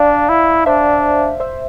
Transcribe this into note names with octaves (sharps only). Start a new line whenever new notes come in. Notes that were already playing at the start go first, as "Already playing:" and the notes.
Already playing: D4 D5 F5
E4
D4 C5 E5
C5 E5